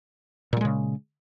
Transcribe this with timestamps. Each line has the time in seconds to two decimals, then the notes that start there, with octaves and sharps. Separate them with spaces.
0.53 A#2
0.57 G3
0.61 G#3
0.65 C#3